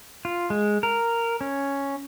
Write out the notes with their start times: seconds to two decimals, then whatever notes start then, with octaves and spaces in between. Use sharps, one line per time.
0.25 F4
0.50 G#3
0.83 A#4
1.41 C#4